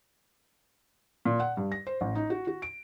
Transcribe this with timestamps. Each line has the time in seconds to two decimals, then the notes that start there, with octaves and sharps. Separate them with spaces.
1.25 A#2
1.40 F#5
1.57 G2
1.72 A#6
1.87 C5
2.01 A1
2.15 D#4
2.30 F#4
2.47 F#4
2.62 D7